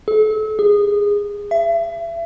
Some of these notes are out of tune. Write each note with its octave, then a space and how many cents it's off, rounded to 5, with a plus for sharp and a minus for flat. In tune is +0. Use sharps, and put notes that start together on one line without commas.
A4 -35
G#4 -20
E5 +35